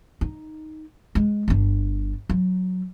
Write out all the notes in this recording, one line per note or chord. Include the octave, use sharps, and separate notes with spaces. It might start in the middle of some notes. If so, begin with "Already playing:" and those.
D#4
G#3
G1 D4
F#3